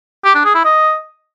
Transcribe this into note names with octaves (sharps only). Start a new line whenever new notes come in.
G4
D4
G#4
E4
D#5